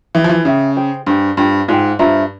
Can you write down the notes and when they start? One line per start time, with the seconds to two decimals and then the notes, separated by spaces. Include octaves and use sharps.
0.15 E3 G#4 E5 G5
0.24 F3
0.29 E3
0.45 C#3 G#4 E5 G5
0.76 G#4 C5 G5
1.06 G2 G#4 C5 G5
1.37 G2 F4 C5 G5
1.68 G#2 F4 C5 G5
1.99 G2 F4 C5 E5 A#5